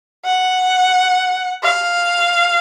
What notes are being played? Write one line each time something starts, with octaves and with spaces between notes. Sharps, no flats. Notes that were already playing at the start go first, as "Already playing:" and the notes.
F#5
F5